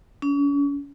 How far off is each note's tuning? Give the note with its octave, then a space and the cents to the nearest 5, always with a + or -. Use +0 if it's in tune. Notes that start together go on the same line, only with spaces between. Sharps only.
C#4 +40